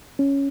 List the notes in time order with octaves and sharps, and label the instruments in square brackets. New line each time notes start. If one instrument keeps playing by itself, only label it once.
[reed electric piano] C#4